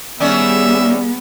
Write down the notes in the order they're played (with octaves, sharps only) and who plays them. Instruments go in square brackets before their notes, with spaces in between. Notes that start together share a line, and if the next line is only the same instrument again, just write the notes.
[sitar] D#3 C#4 D5 [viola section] G3 G#4 [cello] B3 [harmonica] E5